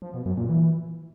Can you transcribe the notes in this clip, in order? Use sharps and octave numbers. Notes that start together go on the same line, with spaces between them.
F3
B2
F#2
A#2
E3